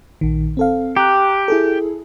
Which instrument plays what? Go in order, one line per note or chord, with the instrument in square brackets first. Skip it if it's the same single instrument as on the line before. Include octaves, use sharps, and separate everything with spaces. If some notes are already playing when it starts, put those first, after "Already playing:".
[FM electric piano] A#1 D#3
C4 A4 F5
[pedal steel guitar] G4 [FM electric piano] A#5 F#6
[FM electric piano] E4 G#4 A4